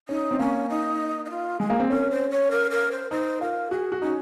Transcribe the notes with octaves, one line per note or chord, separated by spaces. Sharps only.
C#4 D#4
C4
A#3 C#4
D#4
D#4
F4
G#3 G#4
A#3
C4
C#4 A#4
C5
C#5
A#4
A#4
C5
D#4 C5
F4 A#4
F#4 G#4
F#4
C#4 D#4